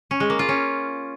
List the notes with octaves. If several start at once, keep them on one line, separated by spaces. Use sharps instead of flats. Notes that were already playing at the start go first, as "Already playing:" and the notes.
C#4
G#3
A#3
F4
C#4